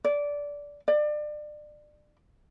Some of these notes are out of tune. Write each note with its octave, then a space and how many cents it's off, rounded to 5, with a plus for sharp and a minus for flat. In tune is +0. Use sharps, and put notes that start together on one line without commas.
D5 -15
D5 +30